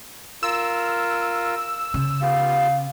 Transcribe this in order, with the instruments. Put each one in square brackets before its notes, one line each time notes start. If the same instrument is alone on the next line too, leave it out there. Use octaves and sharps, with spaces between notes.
[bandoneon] F4 A#4 [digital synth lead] E6
[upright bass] C#3
[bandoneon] B3 F4 G4 [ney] F5